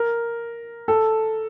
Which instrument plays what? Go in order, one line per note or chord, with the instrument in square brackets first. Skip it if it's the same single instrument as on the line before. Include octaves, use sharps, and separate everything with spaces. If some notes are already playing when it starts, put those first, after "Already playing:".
Already playing: [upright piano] A#4
A4